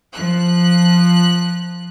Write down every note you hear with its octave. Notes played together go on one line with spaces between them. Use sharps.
F3 F#6